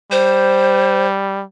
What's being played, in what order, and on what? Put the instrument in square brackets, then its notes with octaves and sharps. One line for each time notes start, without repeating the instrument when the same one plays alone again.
[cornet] G3 [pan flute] C5